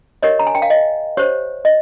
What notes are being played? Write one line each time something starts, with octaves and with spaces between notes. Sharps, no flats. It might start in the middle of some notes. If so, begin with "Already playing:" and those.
G4 A#4 C#5 D#5
A#5
G#5
G5
F5
D#5
G4 C5 C#5
D#5